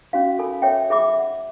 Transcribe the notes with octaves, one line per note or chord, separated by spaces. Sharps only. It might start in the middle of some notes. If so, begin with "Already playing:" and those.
C#4 F#4 F5
A4 A#4 G#5 B5
C#5 E5 G5
G#4 E5 B5 D6
F#5